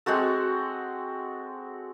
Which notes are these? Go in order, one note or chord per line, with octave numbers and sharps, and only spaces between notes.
G#3 C4 F#4 A4